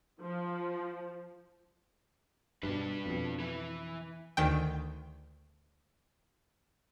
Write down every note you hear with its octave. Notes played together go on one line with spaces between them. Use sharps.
F3
G2 B2 D4 B4
F2 B2
E3 B4
D2 D#3 G5